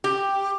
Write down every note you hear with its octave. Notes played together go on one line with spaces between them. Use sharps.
G4